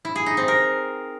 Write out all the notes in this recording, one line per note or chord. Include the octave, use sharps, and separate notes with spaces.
E4
G#4
D#4
C4
A#4